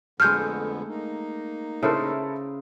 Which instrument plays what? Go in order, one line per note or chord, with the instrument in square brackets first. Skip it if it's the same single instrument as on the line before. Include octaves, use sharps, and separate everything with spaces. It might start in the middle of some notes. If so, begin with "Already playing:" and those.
[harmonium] F2 D3 B3 [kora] G#3 A3 [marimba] F6 G6
[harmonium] A#3 D#4
[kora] C#3 C5 [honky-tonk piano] E4 A4 A#4